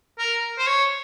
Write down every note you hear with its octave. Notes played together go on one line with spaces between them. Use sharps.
A#4
C5
C#5